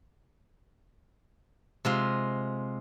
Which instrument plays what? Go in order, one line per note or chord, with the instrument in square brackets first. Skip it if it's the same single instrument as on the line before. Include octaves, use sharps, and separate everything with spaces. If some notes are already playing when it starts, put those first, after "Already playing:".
[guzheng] C3 G#3 F4